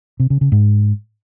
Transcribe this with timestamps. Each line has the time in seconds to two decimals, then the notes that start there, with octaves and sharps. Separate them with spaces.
0.20 C3
0.30 C#3
0.41 C#3
0.52 G#2